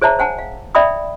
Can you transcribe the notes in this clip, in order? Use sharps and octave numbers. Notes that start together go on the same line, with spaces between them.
G#4 C5 C#5 E5 A5 A#5
C5 F#5 G#5 A5
F5
D5 E5 G5 B5 D#6